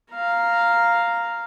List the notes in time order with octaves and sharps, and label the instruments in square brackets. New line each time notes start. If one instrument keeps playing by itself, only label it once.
[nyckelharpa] F5 A#5